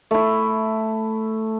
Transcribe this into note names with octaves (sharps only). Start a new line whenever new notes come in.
A3 E4